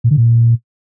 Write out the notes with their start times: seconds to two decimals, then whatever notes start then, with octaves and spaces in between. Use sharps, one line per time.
0.04 A#2
0.11 D3
0.17 A#2